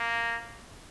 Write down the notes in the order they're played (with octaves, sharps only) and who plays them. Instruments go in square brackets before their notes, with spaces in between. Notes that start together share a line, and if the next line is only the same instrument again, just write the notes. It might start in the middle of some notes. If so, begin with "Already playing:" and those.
Already playing: [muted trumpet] A#3